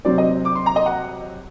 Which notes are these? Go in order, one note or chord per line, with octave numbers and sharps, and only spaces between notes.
C3 F#3 C4 D5
D#5
D6
C6
A#5
D#5
F#5